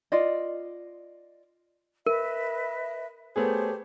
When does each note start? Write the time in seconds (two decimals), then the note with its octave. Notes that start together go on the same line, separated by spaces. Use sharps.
0.12 F4 D5 D#5
2.06 A#4 B4 D#5 E5
3.36 A3 B3 G4 G#4 C5 C#5